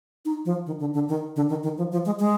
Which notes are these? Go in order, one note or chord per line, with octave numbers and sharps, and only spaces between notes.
D#4
F3
D#3
D3
D3
D#3
D3
D#3
D#3
F3
F3
G#3
G#3